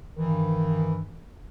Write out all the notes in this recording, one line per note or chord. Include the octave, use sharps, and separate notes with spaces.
G2 D#3 E3